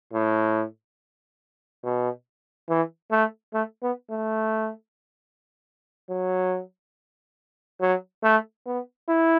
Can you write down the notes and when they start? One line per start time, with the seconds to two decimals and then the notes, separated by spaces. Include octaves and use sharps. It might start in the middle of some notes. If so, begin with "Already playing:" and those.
0.13 A2
1.84 B2
2.69 E3
3.11 A3
3.54 A3
3.83 B3
4.11 A3
6.10 F#3
7.81 F#3
8.24 A3
8.66 B3
9.08 E4